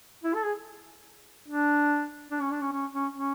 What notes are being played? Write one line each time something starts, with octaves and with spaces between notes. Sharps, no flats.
E4
A4
G#4
D4
D4
C#4
D4
C#4
C#4
C#4
C#4